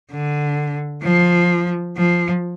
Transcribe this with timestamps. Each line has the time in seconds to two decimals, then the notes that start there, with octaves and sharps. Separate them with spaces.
0.11 D3
1.04 F3
1.97 F3